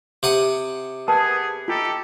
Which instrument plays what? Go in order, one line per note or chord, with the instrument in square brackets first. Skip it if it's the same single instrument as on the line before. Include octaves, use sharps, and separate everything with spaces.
[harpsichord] C3 F#5 D#6
[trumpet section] B3 G#4 [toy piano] A#4 B4 A5
[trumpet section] D#4 G4 A4 [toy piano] F4